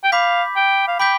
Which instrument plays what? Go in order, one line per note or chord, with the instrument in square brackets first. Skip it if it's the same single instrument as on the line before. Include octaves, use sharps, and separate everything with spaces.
[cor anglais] G5
[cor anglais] F5 [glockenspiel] B5 D6 G6 B6
[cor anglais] G5
F5
[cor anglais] G5 [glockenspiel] B5 D6 G6 B6